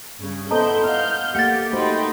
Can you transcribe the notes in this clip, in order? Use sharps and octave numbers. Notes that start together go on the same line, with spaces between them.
G2 C#3
B3 E4 A4 C5 D#5 A5 A#5 G6
D#5 F5 F6 G6
A3 A#3 G4 F#5 A6
A3 D#4 F#4 C5 G5 B5